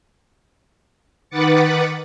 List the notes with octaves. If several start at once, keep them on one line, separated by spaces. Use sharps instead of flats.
D#3 B4 F#5 D6 A6 C#7